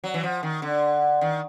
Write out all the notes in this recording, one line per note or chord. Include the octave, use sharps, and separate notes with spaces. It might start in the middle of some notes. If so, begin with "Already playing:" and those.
F#3
E3
F3
D#3
D3
D#3